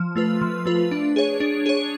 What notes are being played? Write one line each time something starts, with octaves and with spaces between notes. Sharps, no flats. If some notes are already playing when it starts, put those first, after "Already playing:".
Already playing: F3
A3 F4 B4
F3
A3 F4 B4
D4
G#4 C#5
D4
G#4 C#5